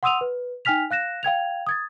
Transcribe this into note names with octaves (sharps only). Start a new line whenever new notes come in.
F#5 C6 D#6 E6 D#7 F7
B4
D#4 G5 G#5 F6 B6 F7
F5 F#6 A#6 E7
F5 G5 G#6 F7
D#6 G#6 A6